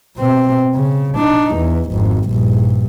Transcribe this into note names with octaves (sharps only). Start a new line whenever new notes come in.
B2 C4
C#3
D4 D#4
E2
G#1 F2
A#1 G2